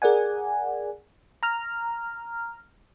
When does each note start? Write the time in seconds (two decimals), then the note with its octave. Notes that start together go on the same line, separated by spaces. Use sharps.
0.02 G#4 A#4 D5 F#5 G#5
1.43 A#5 F6